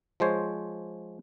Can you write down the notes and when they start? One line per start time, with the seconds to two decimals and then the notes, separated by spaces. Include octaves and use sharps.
0.20 F3 G#3 C5 C#5